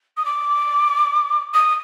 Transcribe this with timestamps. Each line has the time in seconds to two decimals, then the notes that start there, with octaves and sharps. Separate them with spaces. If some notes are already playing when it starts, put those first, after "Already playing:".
0.17 D#6
0.25 D6
1.54 D#6